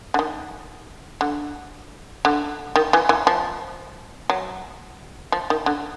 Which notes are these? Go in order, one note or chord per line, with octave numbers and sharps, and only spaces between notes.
D3
D#3
D3
D3
D#3
E3
E3
F3
F#3
F3
D#3
D3